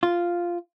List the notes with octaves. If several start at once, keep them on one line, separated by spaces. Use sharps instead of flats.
F4